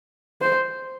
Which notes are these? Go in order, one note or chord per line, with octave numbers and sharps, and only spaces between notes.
C5